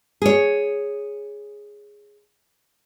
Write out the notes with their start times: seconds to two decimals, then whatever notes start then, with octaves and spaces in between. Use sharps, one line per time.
0.22 G#4 C#5